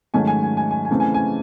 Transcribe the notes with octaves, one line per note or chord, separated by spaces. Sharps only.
G#2 D#3 F#3 A3 C#4 G#5
G#5
G#5
G#5
G#5
G#5
C#3 E3 A3 C4
G#5
G#5